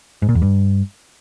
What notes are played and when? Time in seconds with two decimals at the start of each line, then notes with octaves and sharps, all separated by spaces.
0.22 G#2
0.29 A#2
0.35 E2
0.42 G2